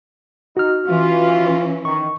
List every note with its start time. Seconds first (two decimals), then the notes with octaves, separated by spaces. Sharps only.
0.57 D#4 F#4 F6
0.87 E3 C#4 F4
1.85 D#3 C#6